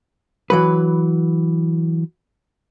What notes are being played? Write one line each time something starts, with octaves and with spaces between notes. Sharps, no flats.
E3 F#3 B4